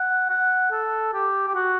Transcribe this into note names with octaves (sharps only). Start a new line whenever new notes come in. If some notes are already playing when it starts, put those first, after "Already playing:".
Already playing: F#5
F#5
A4
G4
G4
F#4